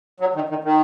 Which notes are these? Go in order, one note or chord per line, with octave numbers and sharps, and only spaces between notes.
F#3
D#3
D#3
D#3